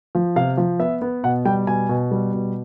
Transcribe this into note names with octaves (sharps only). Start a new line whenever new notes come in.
F3
C3 F5
F3
B3 E5
B3
B2 F#5
G3 G5
B2 G#5
B2
G3
B2